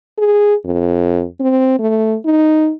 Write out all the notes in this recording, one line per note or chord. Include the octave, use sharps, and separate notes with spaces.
G#4
F2
C4
A3
D#4